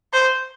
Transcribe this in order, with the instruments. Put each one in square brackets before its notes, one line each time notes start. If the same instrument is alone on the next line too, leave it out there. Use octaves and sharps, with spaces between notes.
[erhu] C5